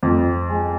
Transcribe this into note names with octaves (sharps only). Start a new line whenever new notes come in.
F2
G#3